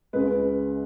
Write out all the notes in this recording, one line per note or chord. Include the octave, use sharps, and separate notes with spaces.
C#2 C#3 G#3 B4